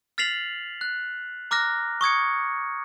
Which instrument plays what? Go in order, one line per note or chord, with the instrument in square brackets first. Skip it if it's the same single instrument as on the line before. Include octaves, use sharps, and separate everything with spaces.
[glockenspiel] F6 A6 B6 C7 F7 F#7
F#6
A#5 D6 F6 F#6 A#6
C#6 D#6 G#6 C#7